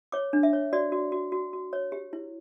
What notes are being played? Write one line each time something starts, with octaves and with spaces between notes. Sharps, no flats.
C#5 D6
D4
E5
C#5
F#4 D5
F#4
F#4
F#4
F#4
C#5
G4
E4